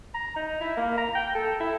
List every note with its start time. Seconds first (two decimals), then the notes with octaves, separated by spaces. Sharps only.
0.14 A#5
0.36 D#4
0.60 E4
0.77 A#3
0.97 A#5
1.15 G5
1.35 A4
1.60 E4